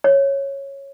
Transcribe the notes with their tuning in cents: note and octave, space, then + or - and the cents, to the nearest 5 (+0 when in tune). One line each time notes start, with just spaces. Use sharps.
C#5 -10